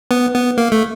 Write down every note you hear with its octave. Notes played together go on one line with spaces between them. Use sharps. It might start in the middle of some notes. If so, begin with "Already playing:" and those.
B3
B3
A#3
A3